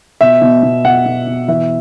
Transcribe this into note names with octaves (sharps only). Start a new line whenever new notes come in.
B2 E5
B2
B2
B2 F#5
B2
B2
E3 E5